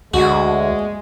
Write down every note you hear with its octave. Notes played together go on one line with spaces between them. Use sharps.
D2 G#3 F#4